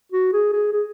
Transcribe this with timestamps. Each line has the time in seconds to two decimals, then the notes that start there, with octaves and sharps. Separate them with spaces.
0.12 F#4
0.33 G#4
0.53 G#4
0.73 G#4